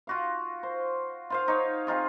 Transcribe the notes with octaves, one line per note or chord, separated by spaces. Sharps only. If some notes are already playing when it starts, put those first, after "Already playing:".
F4 F#4 F5
C5
F4 C5 F5
D#4 C#5
C4 D#4 F4 G#4